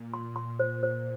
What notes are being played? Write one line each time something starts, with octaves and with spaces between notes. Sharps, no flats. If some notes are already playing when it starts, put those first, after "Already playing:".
Already playing: A#2
C6
C6
C5
C5